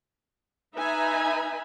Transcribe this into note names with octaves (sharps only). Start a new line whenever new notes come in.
D#4 B4 E5 G#5 A#5 B5